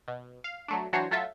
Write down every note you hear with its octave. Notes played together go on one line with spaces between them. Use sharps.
B2
F5
F#3 A3 D4
E3 F#3 D4 F#4 C5 C#5
F#3 A3 F4 A4 E5